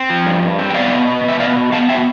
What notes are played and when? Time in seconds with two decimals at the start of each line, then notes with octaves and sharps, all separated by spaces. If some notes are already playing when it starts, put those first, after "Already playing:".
Already playing: C4
0.10 F3
0.26 G2
0.42 G2
0.59 C4
0.70 G5
0.74 B3 D5 F5
0.92 B2
1.07 B3
1.24 B2 E5
1.40 B3 D5 F5
1.56 B2
1.72 B3 F5 A5
1.89 B2 E5 G5